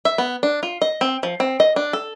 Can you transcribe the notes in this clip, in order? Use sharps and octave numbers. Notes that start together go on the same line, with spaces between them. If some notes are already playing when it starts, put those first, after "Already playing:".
E5
B3
D4
F4
D#5
C4
F3
C4
D#5
D4
A4